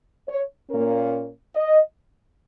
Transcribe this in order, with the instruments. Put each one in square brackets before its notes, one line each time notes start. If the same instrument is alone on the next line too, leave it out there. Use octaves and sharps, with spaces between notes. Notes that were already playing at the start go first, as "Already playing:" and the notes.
[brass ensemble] C#5
A#2 A#3 C#4 A#4
D#5